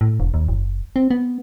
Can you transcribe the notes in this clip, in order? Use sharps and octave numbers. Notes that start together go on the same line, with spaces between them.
A2
E1
D#2
F#1
C4
B3